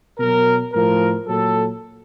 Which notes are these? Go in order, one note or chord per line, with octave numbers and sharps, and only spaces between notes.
B2 F#3 A#4
A2 F3 A#4
A#2 F#3 A4